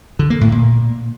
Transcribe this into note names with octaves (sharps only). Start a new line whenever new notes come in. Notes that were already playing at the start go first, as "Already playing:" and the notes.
D3
A#3
A2
A#2